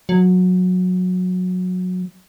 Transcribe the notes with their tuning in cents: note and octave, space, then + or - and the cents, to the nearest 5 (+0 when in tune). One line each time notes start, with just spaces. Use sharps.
F#3 -20